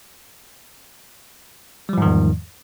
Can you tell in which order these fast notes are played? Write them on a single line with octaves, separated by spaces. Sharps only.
G3 F3 G#2 D#3 E2